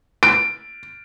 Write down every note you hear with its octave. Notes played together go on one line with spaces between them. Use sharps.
D7